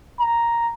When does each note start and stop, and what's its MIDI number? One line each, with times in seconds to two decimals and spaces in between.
0.21 0.70 82